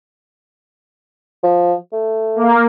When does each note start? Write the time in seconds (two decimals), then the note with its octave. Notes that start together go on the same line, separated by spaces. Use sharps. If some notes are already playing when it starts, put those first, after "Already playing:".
1.43 F3
1.92 A3
2.36 A#3